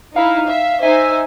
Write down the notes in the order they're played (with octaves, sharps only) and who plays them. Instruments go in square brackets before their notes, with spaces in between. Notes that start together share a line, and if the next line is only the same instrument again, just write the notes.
[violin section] D#4 E4 [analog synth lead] F5
[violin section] E5
[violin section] D#4 C5 G#5 [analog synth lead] E5